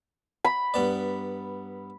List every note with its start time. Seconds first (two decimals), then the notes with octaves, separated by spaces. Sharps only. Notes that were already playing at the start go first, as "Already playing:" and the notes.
0.45 B5
0.74 G2 B3 D5